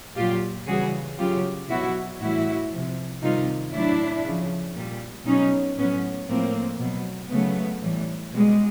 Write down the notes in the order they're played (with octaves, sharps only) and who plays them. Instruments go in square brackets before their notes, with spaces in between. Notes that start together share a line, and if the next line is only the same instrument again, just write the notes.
[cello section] A#2 F#3 F4 G4
C#3 E3 G3 F#4 G#4
C#3 F#3 F4 G4
B2 F#3 E4 F#4
A2 E3 G3 E4 F#4
C3 F3
C3 D#3 G3 D#4 F4
A2 F#3 D4 E4
C#3 F3
A#2 G3
B2 F#3 C#4 D#4
A2 F#3 B3 C#4
A2 F3 A#3 C4
B2 F#3
C#3 F#3 A3 B3
A2 E3 G3
B2 G3 G#3